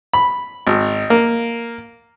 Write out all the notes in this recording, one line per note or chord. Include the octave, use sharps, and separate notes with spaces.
B5
G#1
A#3